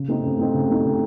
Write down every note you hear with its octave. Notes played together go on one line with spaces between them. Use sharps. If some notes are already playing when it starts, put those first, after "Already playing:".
Already playing: C#3
A3 C4 D#4
C#3
A3 C4 D#4
C#3
A3 C4 D#4
C#3